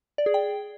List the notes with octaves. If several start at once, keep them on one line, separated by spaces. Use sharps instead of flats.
D5
G#4
G5